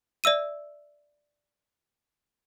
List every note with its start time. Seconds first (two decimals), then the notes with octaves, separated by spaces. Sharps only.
0.24 D5 E5 E6 D#7